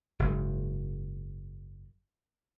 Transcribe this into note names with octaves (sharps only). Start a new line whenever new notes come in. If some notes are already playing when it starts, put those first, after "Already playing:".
F#1 G#2